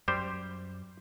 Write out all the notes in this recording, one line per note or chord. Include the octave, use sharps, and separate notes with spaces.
F#2 G3 G4 C5